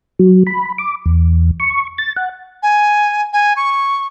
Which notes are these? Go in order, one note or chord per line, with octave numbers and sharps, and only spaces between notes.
F#3
B5
D6
E2
C#6
A6
F#5
G#5
G#5
C#6